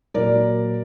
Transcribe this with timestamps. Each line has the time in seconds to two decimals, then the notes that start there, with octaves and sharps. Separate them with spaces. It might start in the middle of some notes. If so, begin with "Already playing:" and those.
0.14 A#2 F#3 A#4 D5